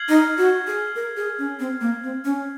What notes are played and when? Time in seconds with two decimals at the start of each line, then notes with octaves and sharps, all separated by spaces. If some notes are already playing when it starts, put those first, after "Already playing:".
Already playing: F6 G#6 C7 F#7
0.09 D#4
0.38 F#4
0.67 G#4
0.96 A#4
1.17 G#4
1.39 C#4
1.60 C4
1.81 A#3
2.03 C4
2.25 C#4